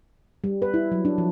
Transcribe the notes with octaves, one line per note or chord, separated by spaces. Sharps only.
G3
B4
E4
F#3
D4
F3